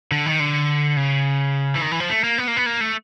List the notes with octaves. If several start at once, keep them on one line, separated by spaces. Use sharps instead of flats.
D3
D#3
D3
C#3
E3
D#3
E3
F3
A3
A#3
B3
A#3
B3
A#3
A3